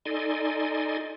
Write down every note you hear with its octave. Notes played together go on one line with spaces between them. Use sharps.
D#4 A4 D5 D#5 G#5 C6